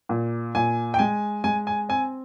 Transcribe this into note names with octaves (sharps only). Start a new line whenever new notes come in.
A#2
A#2 G#5
G5
G#3 G#5
G#3 G#5
G#5
C4 G#5